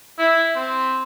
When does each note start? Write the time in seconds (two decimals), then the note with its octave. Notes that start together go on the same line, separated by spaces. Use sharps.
0.18 E4
0.56 C4